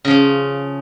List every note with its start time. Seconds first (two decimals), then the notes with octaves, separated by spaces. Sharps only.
0.05 C#3
0.08 F3
0.10 C#4